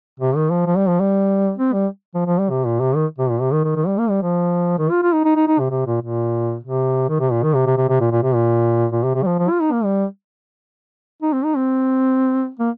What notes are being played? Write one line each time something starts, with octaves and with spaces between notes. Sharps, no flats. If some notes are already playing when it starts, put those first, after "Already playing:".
C3
D#3
F3
F3
G3
F3
G3
C4
G3
F3
F3
G3
C3
A#2
C3
D#3
C3
A#2
C3
D#3
D#3
D#3
G3
A#3
G3
F3
D#3
F4
F4
D#4
D#4
D#4
D#4
C3
C3
A#2
A#2
C3
D#3
C3
A#2
D#3
C3
C3
C3
C3
A#2
A#2
C3
A#2
A#2
C3
C3
G3
F3
F3
F4
D#4
A#3
G3
D#4
C4
D#4
C4
A#3